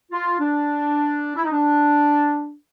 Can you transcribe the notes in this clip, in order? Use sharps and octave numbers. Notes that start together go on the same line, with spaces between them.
F4
D4
E4
D#4
D4